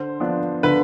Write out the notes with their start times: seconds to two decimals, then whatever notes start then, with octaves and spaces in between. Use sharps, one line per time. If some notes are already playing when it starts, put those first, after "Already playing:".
Already playing: D3 C5
0.20 F3 B3 D4
0.63 D3 B4